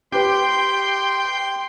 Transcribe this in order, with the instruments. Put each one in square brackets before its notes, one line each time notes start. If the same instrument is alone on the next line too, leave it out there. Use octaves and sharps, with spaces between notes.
[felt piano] G4 B4 [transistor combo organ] G5 [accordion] C6